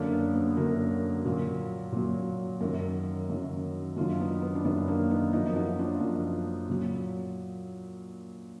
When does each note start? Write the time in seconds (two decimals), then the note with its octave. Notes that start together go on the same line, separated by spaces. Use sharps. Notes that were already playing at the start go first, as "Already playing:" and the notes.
Already playing: F#2 D3 F#3 A#3 D4
0.12 B3
0.34 B3
0.57 F#2 D3 F#3 F#4 A#4
1.25 A#2 F#3
1.92 A#2 F#3
2.61 F#2 D#3 F#3 F#4 A#4
3.29 F#2 D#3 F#3
3.96 F#2 D#3 F#3 D4 F4
4.20 B3 D#4
4.42 B3
4.55 D4
4.65 F#2 D#3 F#3 B3
4.87 A#3 D4
5.11 B3 D#4
5.33 F#2 F3 B3 D#4
5.55 D#4 F#4
5.79 D4 F4
6.01 F#2 F3
6.69 A#2 F#3